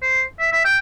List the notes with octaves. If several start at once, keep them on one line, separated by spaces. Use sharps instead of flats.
C5
E5
E5
G5